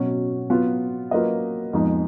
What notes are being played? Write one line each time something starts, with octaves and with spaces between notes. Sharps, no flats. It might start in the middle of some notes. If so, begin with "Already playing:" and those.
Already playing: B2 F#3 C#4
F#3 B3 F4
F#3 A#3 F4 B4 D#5
F2 F3 G#3 B3 D#4